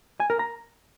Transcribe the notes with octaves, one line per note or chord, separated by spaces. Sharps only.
G#5
A#4
A#5